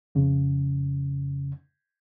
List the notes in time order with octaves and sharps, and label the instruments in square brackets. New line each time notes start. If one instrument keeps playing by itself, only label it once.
[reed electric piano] F2 C#3